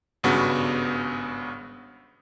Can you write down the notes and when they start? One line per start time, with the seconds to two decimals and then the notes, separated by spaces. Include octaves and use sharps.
0.23 G#1 G2 C#3 B3 F#4